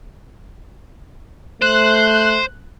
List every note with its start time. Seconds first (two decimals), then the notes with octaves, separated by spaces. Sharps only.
1.62 A3 C5 F#6